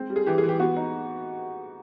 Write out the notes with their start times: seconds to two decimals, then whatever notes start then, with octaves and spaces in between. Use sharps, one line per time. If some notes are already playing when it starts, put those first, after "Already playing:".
Already playing: G#3 C4
0.10 G3
0.16 G#4
0.26 E3 G4
0.38 G#4
0.43 E3
0.49 G4
0.60 B3 F#4
0.77 D#4